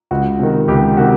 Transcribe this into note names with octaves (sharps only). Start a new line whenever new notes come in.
C#2 F#4
C3 D#3
C#2 G4
C3 D#3 F#4